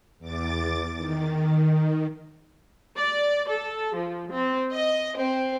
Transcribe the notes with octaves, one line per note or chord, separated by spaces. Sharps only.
E2 D6 A6
D#3
D5
A4
F3
C4
D#5
C4